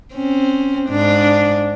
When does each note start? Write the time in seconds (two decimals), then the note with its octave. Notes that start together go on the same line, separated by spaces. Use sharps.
0.14 C4 C#4
0.89 G#2 D4